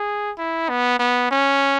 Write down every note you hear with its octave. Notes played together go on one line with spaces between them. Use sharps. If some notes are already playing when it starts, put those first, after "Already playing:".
Already playing: G#4
E4
B3
B3
C#4